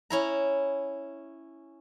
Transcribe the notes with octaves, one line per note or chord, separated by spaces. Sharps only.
C#4 E4 A#5